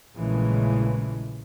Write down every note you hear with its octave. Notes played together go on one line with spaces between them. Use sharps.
A#1 A#2 C#3 E3 G#3 A3